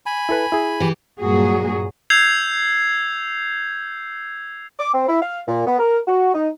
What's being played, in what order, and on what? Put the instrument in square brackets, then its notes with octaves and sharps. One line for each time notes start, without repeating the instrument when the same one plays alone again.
[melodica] G#5 B5
[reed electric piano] E4 A4 B4
E4 G#4
[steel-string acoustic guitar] E3 G4
[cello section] G2 A#2 F#3 F#4 G#4
[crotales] E6 G6 G#6 C7 F7
[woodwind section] D6
C4
E4
F5
A#2
B3
A#4
F#4
D#4